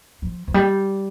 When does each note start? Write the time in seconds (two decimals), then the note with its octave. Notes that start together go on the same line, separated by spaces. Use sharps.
0.22 F3
0.48 F3
0.54 G3